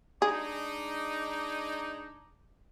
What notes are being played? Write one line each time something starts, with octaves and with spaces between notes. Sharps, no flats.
G#3 D4 D#4 G#4